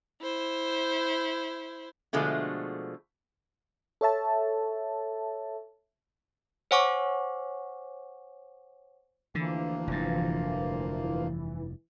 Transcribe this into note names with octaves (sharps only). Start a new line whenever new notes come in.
E4 C5
B2 D3 F3 G#3 A3
A4 C#5 E5 A5
C5 C#5 F#5 G#5 C#6 D6
D2 D3 E3 F3 A#3
F1 G2